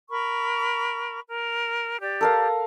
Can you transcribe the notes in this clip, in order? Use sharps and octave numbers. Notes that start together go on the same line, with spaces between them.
A#4 B5 C#6
A#4
G4 D5
A4 A#4 F5